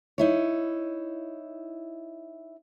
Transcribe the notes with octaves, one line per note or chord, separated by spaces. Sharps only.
D#4 E4 C#5